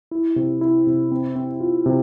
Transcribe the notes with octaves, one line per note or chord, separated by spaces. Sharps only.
E4
C3
E4
C3
C4
C4
F4
C3